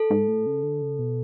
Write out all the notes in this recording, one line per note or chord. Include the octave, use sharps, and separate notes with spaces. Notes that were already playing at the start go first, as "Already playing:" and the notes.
Already playing: A4
G#2
A2
C#3
D3
C#3
B2